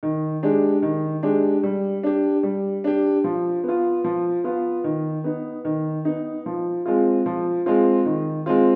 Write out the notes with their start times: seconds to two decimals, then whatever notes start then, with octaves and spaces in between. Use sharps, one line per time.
0.03 D#3
0.43 G#3 D4 G4
0.82 D#3
1.23 G#3 D4 G4
1.63 G3
2.03 D4 G4
2.43 G3
2.84 D4 G4
3.24 F3
3.64 B3 F4
4.04 F3
4.44 B3 F4
4.84 D#3
5.24 B3 D#4
5.65 D#3
6.05 B3 D#4
6.46 F3
6.86 G#3 C4 F4
7.26 F3
7.66 G#3 C4 F4
8.06 D#3
8.46 G#3 C4 F4